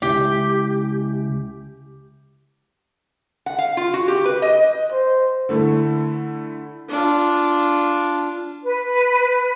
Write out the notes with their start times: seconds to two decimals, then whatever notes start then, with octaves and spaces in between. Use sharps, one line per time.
0.02 C#2 E4 G4 D5
3.46 F#5
3.58 F5
3.77 F4
3.94 F#4
4.08 G4
4.26 B4
4.42 D#5
4.92 C5
5.49 D3 A3 E4 A4
6.90 D4 F4
8.64 B4